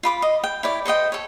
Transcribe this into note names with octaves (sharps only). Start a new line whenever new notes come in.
F4 B5 D6
D#5
G5
E4 C#5 D5
A4 C5 D#5 G5
A4 C#5